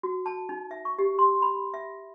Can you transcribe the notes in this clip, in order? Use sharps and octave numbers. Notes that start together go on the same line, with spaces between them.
F#4
A5
D#4
E5
C#6
G4
C6
B5
E5